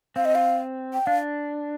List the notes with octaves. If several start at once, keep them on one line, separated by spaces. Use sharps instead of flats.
C4 F5
D#5
F5
G5
D4 F5